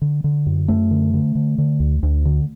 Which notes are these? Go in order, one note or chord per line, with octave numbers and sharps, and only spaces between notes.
D3
D3
F#2
F#2 A3
D3
D3
D3
D3
D2
D2
D3